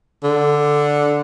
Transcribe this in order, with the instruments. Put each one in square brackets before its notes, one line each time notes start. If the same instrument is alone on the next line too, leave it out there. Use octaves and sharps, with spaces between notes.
[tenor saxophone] D3